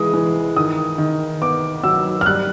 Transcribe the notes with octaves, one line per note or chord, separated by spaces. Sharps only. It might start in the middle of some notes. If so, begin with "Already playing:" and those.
Already playing: E3 G#3 D#6
E3
D#3 D#6
D#3
B3 D6
F#3 E6
F6
G3 F#6